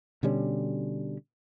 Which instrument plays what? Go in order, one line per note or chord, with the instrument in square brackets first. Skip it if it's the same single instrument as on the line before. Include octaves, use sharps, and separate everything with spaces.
[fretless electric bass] B2 D3 G3 C#4